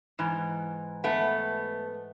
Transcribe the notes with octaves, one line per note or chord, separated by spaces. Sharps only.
G#2 E3
A3 B3